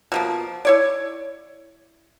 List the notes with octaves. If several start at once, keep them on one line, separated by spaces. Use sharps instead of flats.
B2 F3 A#3
E4 C#5 D5